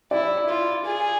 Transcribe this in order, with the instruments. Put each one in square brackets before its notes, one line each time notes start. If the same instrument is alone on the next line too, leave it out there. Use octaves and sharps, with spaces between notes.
[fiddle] E4 [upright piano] D5
[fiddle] F4
G#4